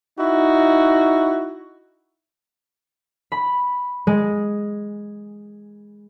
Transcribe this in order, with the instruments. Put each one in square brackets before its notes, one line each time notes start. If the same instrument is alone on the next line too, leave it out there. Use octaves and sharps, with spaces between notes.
[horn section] D#4 E4 F#4
[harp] B5
G#3